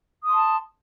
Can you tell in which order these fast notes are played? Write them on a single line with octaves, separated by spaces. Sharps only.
D#6 C6 A5